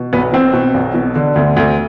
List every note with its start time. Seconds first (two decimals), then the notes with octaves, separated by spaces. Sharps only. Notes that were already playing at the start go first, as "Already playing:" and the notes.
Already playing: B2
0.13 B1 B3
0.33 B2 C4
0.53 B2
0.74 B1
0.94 B2
1.15 D3
1.36 D2
1.56 D2